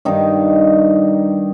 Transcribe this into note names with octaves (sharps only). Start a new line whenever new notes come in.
G2 D#3 D#4